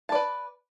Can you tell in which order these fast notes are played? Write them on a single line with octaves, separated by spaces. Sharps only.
A5 D5 B4